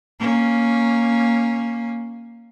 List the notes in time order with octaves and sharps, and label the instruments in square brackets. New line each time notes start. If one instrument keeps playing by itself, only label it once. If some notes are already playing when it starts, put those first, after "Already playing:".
[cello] A#3 C#4